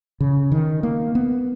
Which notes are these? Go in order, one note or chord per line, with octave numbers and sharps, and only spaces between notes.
C#3
D#3
A#3
B3